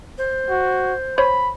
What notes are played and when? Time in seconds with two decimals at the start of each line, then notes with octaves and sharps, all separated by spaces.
0.18 C5
0.50 F#4
1.18 C5 C#5 B5